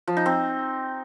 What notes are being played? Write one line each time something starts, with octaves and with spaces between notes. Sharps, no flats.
F3
D#4
C4